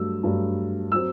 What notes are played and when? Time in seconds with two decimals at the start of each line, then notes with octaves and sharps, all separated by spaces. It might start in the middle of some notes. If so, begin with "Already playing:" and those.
Already playing: G2 F#3 A3 E6
0.23 G2 F#3 A3
0.92 F#3 C4 E6